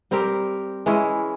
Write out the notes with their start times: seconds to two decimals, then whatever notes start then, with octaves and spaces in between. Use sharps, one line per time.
0.11 G3 C4 G4 A#4
0.86 E3 G#3 C#4 E4